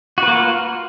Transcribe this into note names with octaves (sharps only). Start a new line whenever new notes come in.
A#3 F4 F#4 B4